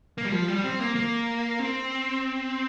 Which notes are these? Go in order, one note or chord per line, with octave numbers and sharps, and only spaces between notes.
A#3
G3
F3
G3
C4
A#3
A#3
C4